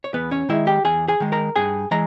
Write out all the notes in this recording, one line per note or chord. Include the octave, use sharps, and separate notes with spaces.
C#5
E2 B3 B4
C#4 C#5
D#3 G#3 E4 E5
G4 G5
E2 G#4 G#5
G#4 G#5
D#3 G#3
A#4 A#5
G2 G#4 G#5
E3 G#3 A#5